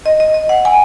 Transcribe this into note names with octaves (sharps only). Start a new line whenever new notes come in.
D#5
D#5
D#5
F#5
G#5